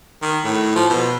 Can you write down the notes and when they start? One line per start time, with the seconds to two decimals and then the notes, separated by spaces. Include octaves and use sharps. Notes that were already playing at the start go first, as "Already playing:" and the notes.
0.22 D#3
0.45 A2
0.76 F3
0.90 B2